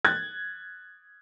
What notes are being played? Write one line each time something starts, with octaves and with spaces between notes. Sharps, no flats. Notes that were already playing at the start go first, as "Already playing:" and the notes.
F#6 G#6 A6